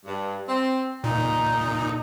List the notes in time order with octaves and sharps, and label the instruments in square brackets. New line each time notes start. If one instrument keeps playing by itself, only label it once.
[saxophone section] G2
C4
[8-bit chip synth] A#2 [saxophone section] D#4